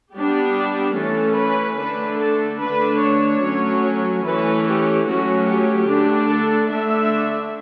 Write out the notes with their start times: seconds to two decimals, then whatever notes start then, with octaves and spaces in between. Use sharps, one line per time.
0.14 G3 B3 D4 G4
0.96 E3 A3 C#4 A4
1.37 B4
1.78 D3 A3 D4 B4
2.20 A4
2.60 D3 A3 D4 B4
3.01 C#5
3.43 F#3 A3 C#4
4.25 E3 A3 C#4 B4
4.66 G4
5.06 F#3 A3 C#4 F#4
5.48 G4
5.88 D3 A3 D4
6.29 A4
6.71 D3 A3 D4 E5